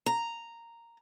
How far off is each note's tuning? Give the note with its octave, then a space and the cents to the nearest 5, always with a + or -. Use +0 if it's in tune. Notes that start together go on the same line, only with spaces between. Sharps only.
A#5 -5